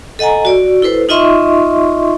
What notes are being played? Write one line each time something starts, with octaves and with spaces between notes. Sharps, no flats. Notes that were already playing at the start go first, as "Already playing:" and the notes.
A4 D#5 F#5 G#5 A#5
F#4 D5
E4 A4 B4 C5
D#4 F4 D#5 E5 C6 C#6